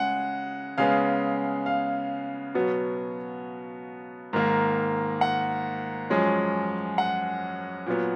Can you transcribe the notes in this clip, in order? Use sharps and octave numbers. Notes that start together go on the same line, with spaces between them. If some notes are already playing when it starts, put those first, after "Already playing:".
Already playing: C#3 G#3 F#5
C#3 G#3 B3 F5
F5
B2 F#3 B3
G#2 D#3 A#3
F#5
F#2 F3 G#3 C#4
F#5
A#2 F#3 B3